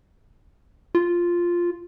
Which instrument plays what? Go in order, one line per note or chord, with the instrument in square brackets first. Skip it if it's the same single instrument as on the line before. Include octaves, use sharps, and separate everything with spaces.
[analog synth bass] F4